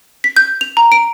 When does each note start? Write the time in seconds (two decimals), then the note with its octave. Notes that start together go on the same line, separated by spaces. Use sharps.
0.24 B6
0.37 G6
0.61 F7
0.77 A#5
0.92 D7